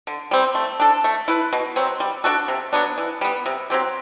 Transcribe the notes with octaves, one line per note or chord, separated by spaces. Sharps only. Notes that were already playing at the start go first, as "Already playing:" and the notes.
D3
G3 C4
A3
D4 A4
A3
E4 B4
B2
F#3 C4
G3
D4 F#4 A4
C3
F#3 B3 D4
E3
G3 B3
C3
F#3 C4 G4